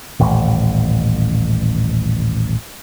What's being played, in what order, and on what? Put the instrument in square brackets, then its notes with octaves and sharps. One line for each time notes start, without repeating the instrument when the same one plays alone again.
[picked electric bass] D#1 A1